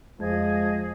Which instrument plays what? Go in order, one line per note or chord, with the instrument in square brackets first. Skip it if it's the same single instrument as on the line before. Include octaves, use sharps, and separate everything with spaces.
[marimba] F2 [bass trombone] F3 [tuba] G#3 [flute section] G#4 D#5 G#6